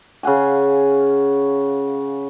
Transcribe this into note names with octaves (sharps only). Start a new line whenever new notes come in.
C#3 F5 F#5 G#5